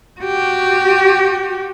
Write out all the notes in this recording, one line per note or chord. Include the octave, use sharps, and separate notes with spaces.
F#4 G4